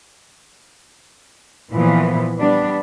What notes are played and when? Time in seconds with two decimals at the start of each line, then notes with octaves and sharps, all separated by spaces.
1.72 A#2 E3 F3 B3
2.38 G3 B3 D4